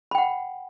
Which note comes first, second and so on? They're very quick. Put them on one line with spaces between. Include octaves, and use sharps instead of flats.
B5 G5 F#5